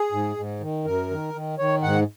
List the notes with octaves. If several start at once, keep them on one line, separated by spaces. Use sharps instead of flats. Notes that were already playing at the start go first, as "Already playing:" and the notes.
Already playing: G#4
G#2
G#2
D#3
F#2 A#4
D#3
D#3
D#3 C#5
G#2 F#5